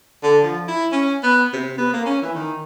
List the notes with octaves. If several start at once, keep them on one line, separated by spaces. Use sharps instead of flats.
D3
F3
E4
C#4
B3
C3
B3
A#3
C#4
E3
D#3